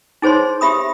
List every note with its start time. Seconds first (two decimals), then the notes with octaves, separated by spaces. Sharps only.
0.22 D#4 G#4 C5 C#5 C6
0.61 G4 E5 B5 D#6